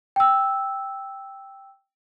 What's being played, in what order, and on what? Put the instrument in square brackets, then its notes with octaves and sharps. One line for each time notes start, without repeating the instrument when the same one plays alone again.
[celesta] G5 E6